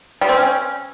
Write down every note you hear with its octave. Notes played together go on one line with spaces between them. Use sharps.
G3
C4
C#4